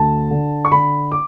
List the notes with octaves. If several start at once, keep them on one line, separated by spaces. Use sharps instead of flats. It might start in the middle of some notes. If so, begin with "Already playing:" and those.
Already playing: D2 A5
D3
C#6
D3 B5
D6